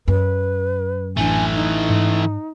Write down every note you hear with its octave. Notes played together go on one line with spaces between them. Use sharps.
F#2 B4
A1 E3 A3 C#4 D4 G#5
D#4
G#2